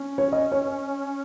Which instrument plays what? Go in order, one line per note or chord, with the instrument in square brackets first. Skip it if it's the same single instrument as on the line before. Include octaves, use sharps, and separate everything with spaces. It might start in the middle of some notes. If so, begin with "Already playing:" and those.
Already playing: [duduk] C#4
[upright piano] C#5
D#5
C#5